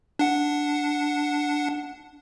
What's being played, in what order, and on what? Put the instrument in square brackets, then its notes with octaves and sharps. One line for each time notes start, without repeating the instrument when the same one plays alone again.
[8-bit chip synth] D4 F#5